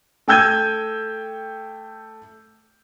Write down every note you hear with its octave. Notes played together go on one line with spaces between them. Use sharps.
A3 G5 E6 G6 G#6 D#7